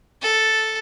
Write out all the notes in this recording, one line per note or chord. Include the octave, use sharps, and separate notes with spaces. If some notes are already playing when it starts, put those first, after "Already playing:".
A4